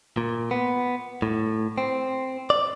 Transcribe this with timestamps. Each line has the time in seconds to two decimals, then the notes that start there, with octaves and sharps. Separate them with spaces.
0.17 A#2
0.51 B3
1.22 A2
1.78 C4
2.50 D5